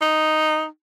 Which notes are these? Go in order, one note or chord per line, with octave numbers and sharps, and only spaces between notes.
D#4